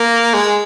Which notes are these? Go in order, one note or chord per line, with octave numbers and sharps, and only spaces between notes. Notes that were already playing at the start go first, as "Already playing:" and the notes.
Already playing: A#3
G#3